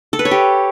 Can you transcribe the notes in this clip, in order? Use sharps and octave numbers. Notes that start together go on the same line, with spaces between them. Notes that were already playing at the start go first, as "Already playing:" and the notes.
A4
B4
C#5
G4